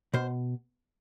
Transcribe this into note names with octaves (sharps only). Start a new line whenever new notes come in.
B2 C5